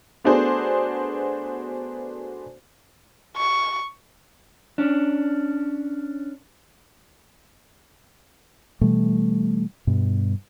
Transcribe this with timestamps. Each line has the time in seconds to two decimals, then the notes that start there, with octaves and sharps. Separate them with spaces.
0.24 A3 B3 D4 F#4 G#4 C5
3.37 C#6
4.78 C#4 D4
8.81 B2 E3 G3 A3
9.87 G2 B2